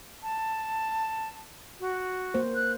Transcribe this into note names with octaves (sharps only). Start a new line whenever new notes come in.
A5
F#4
A#3 C5
F#6